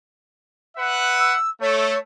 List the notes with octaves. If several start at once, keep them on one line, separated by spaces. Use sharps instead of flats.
B4 E5 F#5
E6
A3 C#5